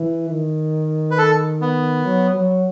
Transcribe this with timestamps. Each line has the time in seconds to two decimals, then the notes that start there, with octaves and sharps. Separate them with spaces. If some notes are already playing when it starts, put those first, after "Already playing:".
Already playing: E3
0.30 D#3
1.11 B4
1.18 A4
1.61 B3
2.05 F#3
2.34 F#3